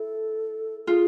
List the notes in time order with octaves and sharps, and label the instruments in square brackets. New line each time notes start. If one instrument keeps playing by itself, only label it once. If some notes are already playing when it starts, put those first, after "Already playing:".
Already playing: [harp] E4 [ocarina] A4
[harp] F4 [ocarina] G#4